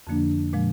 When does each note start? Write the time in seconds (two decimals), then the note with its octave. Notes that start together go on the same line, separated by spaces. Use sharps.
0.07 F2 D3 F3 A#3 D4
0.53 A#2 F3 G#3